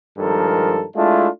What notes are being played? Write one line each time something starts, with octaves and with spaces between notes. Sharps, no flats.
G2 D#3 F3 G#3 A4 A#4
G#3 A3 D4 E4 F4